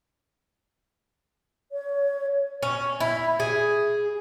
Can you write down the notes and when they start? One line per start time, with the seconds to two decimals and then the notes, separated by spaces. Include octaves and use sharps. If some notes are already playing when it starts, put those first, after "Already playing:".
1.72 C#5
2.63 C#4
3.00 E4
3.40 G#4